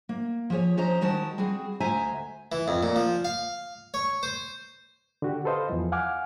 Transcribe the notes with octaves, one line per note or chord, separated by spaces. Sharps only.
A#3
F3 G4 G#4 C#5
F3 C#4 C5 C#5 D#5 A#5
D#3 G3 G#3 F#4 A5
G3 C4 F#4 G#4
D2 G#3 C5 E5 G#5 A#5
E3
F2
A#2
F3
F5
C#5
C5
D3 F#4 G4
A4 B4 C5 D#5 F5
E2 E3 F3
F5 F#5 G#5 D6 F6